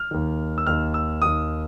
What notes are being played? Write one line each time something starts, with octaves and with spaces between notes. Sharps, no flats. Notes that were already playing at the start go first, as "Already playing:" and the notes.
Already playing: F6
D#2 D#3
E6
D#2 D#3 F6
E6
D#2 D#3 D#6